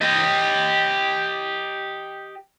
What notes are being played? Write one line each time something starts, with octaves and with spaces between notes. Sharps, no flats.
G4 D#5